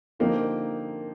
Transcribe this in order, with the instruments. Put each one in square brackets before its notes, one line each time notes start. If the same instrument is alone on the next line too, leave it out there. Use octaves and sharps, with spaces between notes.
[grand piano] D3 F3 C4 D#4 G4 [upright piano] A#3